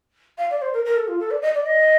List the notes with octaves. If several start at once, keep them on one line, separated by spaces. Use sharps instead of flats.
F5
D5
C5
A#4
A#4
A4
F4
A4
D5
D#5
D5
D#5